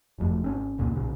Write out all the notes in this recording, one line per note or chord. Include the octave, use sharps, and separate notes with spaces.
F#1 F2 A3
G#1 C4 C#4
E1 C2 A#2
B1 A#2 C#3